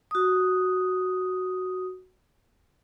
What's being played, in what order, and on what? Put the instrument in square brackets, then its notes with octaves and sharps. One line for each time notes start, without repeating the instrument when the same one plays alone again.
[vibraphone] F#4 D#6